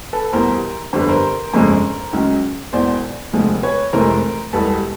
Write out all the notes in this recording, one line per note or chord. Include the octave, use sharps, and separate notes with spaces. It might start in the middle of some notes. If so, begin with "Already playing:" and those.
A4 B4
E2 B2 G3 A#4 C5
G1 F2 D3 G3 C5
B4
A#4 C5
G1 F2 C#3 F3 G#3
C#2 C#3 F#3
E1 E2 B2 C5 D5
E1 D2 C3 F3 G#3
B4 C#5
F1 F2 C3 E3 G#3 A#4 C5
E1 E2 B2 G3 A4 B4